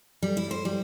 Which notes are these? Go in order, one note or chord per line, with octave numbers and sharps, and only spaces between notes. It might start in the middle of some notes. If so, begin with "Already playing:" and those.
G3
E4
C5
G3